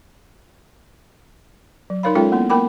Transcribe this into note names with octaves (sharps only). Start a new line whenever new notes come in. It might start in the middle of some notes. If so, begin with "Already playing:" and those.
F#3
D#4 A#4 C#5 F5 B5
G#3 C#4 F4 A4 C#5 G5
A#3 B3 E4
A#3 B3 A#4 G5 B5 D6